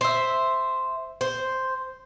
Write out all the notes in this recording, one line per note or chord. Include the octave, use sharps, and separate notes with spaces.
C5 E5
C5